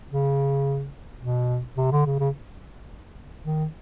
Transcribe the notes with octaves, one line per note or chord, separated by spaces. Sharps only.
C#3
B2
C3
D3
C#3
C#3
D#3